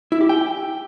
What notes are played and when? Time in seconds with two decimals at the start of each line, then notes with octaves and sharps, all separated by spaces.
0.12 E4
0.21 G4
0.29 G5